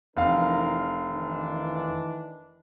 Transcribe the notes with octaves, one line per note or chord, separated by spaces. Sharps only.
F1 E3 D4 A#4 F5
D#3 E3 D4